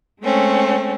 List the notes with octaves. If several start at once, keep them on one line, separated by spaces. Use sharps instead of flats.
G#3 A3 C4 C#4